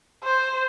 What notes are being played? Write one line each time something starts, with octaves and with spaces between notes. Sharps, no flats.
C5